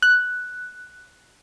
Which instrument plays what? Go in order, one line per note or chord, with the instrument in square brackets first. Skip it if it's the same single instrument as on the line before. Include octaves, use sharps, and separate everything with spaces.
[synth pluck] F#6